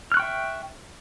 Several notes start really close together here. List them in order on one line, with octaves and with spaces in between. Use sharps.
F6 F#6 C#6 G5 E5